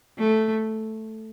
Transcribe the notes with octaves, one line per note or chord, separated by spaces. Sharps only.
A3